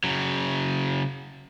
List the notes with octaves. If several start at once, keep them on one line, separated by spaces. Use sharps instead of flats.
C#3 F#3